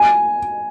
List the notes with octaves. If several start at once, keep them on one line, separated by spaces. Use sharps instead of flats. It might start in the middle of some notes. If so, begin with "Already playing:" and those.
Already playing: G#5